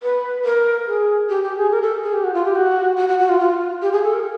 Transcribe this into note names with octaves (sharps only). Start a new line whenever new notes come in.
B4
A#4
G#4
G4
G4
G#4
A#4
A4
G#4
G4
F#4
F4
G4
F#4
F#4
F#4
F#4
F4
F4
G4
G#4
A4
A#4